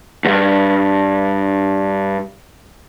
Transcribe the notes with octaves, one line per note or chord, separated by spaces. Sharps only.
D2 G2